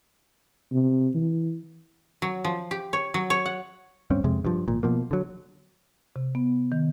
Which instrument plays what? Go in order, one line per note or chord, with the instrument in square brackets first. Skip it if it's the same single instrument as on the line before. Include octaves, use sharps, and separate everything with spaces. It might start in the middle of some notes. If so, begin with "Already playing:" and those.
[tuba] C3
E3
[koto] F#3
F3
G4
C#5
F#3
C#5
F#5
[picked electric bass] D1 G2 C4 C#4
F2 C3 G#3
G2 F3
G#1 A#2
B2 F3 A#3
D3 F#3
[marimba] C3
B3
D#3